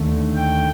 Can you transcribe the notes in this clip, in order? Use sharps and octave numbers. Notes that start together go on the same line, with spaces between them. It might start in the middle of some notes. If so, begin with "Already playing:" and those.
Already playing: D#2 D3 A3
G5